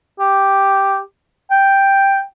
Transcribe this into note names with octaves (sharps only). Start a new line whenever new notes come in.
G4
G5